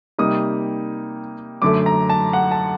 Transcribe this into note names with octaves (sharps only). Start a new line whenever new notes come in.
C3 G3 A#3 D#4 D#6
F#2 D3 A3 D6
A#5
A5
F#5
A5